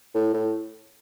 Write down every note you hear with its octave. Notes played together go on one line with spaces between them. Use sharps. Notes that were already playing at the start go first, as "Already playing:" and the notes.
A2
A2